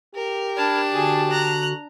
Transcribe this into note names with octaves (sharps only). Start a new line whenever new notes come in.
G4 A#4
D4 A5 B5 F6 G#6
D3 F#4 G#4
A#5 F#6